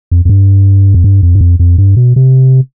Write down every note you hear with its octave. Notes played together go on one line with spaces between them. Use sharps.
F2
F2
G2
F2
G2
F2
G2
F2
F2
G2
B2
C3